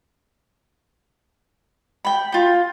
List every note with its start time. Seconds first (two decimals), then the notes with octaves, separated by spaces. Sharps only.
2.05 G5 B5
2.32 F4 G5